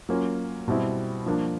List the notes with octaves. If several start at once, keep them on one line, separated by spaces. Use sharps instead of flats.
F#3 A#3 C#4 F4
B2 G3 C4 E4
F3 A#3 D4